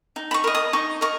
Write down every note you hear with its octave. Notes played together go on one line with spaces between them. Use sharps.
D#4
B5
C#6
A#4 D#5
D#6
D#4 C#6
A#4 D#5 C#6